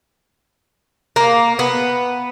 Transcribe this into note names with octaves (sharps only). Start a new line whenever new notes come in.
A#3
B3